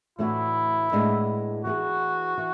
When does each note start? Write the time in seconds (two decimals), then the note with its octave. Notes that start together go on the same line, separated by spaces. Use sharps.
0.19 A2 E3 A3 D4 E4 F#4
0.92 A2 G#3 B3 D4
1.65 E3 B3 E4 F#4 G#4
2.38 E3